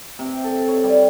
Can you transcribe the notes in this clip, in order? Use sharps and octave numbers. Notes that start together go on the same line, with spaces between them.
C3
A4
C#5
G3